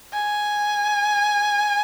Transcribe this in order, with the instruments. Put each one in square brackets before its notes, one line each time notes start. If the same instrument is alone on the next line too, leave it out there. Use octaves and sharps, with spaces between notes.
[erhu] G#5